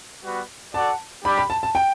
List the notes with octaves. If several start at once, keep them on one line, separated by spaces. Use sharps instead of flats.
G3 B3 F#4 B4
F#4 A4 D5 F#5 A5
G3 D4 G4 B5
B5
A5
A5
G5